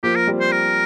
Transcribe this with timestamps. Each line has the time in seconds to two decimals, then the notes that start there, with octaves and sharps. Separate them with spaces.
0.03 F3 A#3 G4
0.16 A#4
0.27 G3 C4
0.40 C5
0.52 A#4